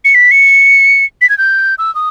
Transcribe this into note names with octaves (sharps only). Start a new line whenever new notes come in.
C#7
B6
C#7
B6
G#6
G6
E6
D#6